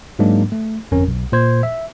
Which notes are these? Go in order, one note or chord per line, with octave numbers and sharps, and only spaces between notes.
G#2 F#3 G#3 A#3 D4
A3
G1 F2 C#4 A#4
B1
A#2 C5 G#6
E5